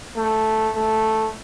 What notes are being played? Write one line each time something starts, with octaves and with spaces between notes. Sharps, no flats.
A3
A3